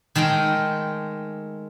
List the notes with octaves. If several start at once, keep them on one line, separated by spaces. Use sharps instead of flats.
D#3 G#3 A3 G5